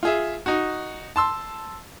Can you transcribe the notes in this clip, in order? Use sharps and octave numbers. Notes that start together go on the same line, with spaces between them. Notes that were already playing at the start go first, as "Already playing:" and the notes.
F4 G#4 E5
D#4 F#4
A5 C6 E6